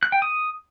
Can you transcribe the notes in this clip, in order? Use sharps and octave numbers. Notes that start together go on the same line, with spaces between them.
F#6
G5
D#6